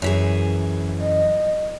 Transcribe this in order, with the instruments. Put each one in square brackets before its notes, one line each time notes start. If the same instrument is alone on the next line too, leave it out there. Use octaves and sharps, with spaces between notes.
[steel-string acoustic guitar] F#2 E3 G#4
[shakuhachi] D#5